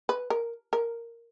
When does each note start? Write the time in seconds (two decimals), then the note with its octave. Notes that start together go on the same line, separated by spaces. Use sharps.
0.09 B4
0.30 A#4
0.73 A#4